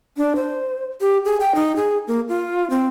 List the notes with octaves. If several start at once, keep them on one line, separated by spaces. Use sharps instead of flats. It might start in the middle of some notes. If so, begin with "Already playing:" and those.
D4
C5
G4
G#4
G5
D#4
G#4
A#3
F4
C4